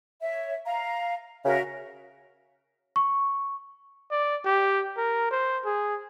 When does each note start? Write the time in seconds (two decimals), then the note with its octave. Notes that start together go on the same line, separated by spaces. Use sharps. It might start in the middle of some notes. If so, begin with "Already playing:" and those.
0.21 C#5 E5
0.65 F5 A#5
1.45 C#3 F#4 A#4 E5
2.96 C#6
4.11 D5
4.45 G4
4.97 A#4
5.31 C5
5.65 G#4